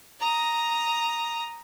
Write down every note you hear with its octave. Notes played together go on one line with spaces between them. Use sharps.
A#5 D#6